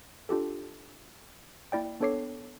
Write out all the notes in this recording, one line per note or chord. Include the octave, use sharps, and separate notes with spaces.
D4 F4 G4 A4
A#3 E4 D5 G5
B3 D4 A4 C#5 D6 C7